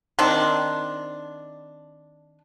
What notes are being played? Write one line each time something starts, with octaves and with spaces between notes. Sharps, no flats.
D#3 C4 D4